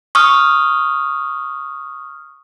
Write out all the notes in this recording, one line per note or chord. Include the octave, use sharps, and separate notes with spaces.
C#6 D#6 F6